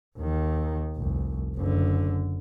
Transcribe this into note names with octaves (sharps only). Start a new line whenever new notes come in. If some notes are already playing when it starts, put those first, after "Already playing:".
D#2 D#3
F1 C2
F#1 D3